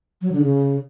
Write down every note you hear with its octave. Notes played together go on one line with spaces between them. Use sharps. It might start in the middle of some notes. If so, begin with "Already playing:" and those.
F#3
D3
C#3